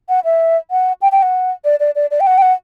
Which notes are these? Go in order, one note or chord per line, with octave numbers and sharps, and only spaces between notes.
F#5
E5
F#5
G5
G5
F#5
D5
D5
D5
D5
G5
F#5
G5
F#5